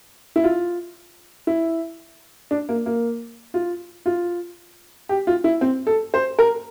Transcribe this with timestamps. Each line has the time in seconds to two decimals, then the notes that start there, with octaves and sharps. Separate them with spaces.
0.36 E4
0.44 F4
1.47 E4
2.51 D4
2.69 A#3
2.86 A#3
3.54 F4
4.06 F4
5.09 G4
5.27 F4
5.44 E4
5.61 C4
5.87 A4
6.14 C5
6.39 A#4